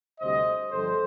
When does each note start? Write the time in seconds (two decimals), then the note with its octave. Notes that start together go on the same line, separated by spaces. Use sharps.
0.20 D2 C3 G3 C5 D#5
0.71 G1 G2 F3 A4 C5